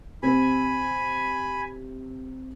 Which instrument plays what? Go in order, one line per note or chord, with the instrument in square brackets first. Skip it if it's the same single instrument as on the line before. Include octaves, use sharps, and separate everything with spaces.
[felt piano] C3 C4 [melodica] G#5 B5